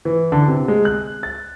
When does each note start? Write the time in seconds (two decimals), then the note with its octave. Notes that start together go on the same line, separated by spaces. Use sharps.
0.05 E3
0.32 D3
0.48 C3
0.68 G#3
0.85 F#6
1.23 A6